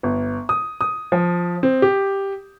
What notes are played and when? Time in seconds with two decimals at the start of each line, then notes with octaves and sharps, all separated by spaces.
0.03 G1
0.49 D#6
0.81 D#6
1.12 F3
1.63 C4
1.82 G4